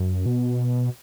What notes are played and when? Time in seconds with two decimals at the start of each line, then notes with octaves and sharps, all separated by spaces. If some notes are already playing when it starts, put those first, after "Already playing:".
Already playing: F#2
0.26 B2